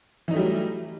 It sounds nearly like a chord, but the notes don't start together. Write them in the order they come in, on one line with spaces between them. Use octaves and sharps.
E3 D#4 A3 G3 F#3